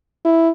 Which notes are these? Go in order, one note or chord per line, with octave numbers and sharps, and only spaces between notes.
E4